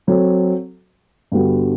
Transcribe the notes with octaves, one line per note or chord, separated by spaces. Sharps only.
F#3 C4 F#4 A4
G2 D3 G3 B3 F#4